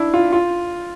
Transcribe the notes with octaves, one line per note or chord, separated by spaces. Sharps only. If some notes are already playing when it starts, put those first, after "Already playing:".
Already playing: D4 E4
F4
F4